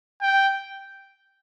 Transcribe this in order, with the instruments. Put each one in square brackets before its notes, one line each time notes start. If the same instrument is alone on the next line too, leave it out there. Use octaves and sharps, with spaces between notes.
[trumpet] G5